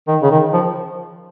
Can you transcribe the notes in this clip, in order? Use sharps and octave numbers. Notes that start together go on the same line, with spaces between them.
D#3
C#3
D#3
F3